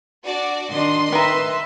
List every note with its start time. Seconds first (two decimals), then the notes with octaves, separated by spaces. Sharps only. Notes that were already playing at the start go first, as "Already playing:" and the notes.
0.25 D4 F#4 D5
0.70 D#3 D4 D#5 C6
1.12 D#3 B4 E5 A#5